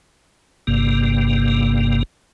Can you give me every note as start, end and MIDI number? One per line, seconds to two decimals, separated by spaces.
0.67 2.03 31
0.67 2.03 43
0.67 2.03 48
0.67 2.03 58